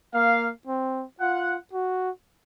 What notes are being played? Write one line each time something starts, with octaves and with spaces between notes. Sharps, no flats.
A#3 F5
C4
F4 F#5
F#4